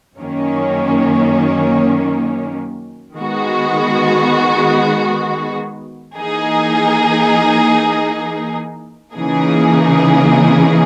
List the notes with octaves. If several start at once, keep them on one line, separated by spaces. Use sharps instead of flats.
F#2 D#3 A#3 C#4
D#3 G#3 B3 F#4
E3 A#3 D#4 G#4
C#3 E3 A#3 D#4 G#4